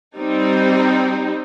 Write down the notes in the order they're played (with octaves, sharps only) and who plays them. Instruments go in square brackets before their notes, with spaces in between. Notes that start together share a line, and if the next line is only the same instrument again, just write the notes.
[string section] G3 C4 D#4